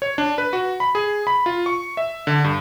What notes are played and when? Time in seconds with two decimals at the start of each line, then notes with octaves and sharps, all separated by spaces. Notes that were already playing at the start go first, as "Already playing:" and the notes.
0.02 C#5
0.18 D4
0.38 B4
0.53 F#4
0.80 B5
0.95 G#4
1.27 B5
1.46 F4
1.66 C#6
1.97 E5
2.27 D3
2.44 G2